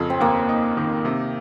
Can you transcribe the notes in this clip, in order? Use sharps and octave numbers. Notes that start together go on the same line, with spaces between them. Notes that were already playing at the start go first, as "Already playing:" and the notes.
Already playing: F2 C#3
C4
D#2 A#3
D#4
D#3
C3